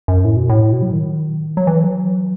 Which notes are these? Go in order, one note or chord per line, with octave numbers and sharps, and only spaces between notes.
F#2
A2
B2
A2
B2
F#3
D#3
F#3
E3
F#3